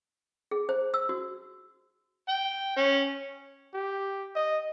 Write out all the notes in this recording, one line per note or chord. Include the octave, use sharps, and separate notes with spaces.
G#4
C5
E6
F#4
G5
C#4
G4
D#5